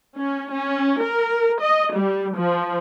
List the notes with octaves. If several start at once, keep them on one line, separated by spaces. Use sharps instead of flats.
C#4
C#4
A#4
D#5
G3
F3